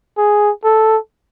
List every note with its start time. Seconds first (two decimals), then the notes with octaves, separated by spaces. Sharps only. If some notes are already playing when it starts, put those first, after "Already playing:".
0.18 G#4
0.64 A4